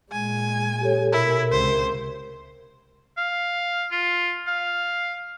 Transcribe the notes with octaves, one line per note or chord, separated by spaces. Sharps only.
A#2 G#3 G#5
G4 A4 C#5
B2 E4 A#4
C#2 C3 C5
F5
F4
F5